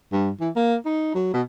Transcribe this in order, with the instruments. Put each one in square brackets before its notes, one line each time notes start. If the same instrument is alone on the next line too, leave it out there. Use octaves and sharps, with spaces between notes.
[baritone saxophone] G2
E3
A#3
D#4
F#3
B2